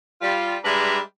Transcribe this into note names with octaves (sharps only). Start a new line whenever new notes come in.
G3 F4
G3 G#3 D4 B4 E5 A#5